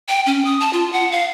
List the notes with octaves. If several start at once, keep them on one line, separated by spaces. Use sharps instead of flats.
G5
C#4
D#6
A5
F4
F#5
F5